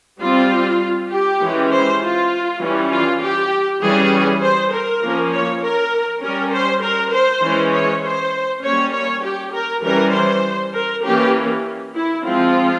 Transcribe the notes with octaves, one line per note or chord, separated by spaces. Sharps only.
G3 C4 F4
G4
E3 G#3 C#4
C5
F4
E3 G3 C#4
F4
G4
E3 G3 C#4 G#4
C5
A#4
F3 A#3 C#4
C#5
A#4
G3 C#4 A#4
C5
A#4
C5
E3 G#3 C#4
C#5
C5
G3 A#3 C#4 C#5
C#5
G4
A#4
E3 G3 C#4 A#4
C5
A#4
E3 A#3 C#4 G4
E4
F3 G#3 C4 F4